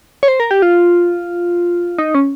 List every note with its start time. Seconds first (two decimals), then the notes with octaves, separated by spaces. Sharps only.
0.23 C#5
0.28 C5
0.40 A#4
0.51 G4
0.62 F4
1.98 D#4
2.15 C#4